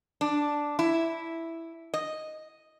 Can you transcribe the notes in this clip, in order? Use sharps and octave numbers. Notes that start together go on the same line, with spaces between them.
D4
E4
D#5